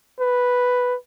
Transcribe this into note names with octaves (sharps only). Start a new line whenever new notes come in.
B4